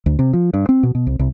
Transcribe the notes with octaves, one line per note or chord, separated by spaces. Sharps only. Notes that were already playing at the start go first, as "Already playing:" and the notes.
D2
C3
F3
G2
C4
B2
B2
C2
C2